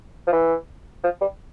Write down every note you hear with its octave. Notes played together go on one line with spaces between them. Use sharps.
F3
E3
F3
G3